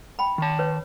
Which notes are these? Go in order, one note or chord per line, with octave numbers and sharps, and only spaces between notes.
G5 B5
D#3 A5
B4 C#5